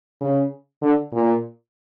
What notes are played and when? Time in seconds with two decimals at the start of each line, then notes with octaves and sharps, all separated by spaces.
0.21 C#3
0.82 D3
1.13 A#2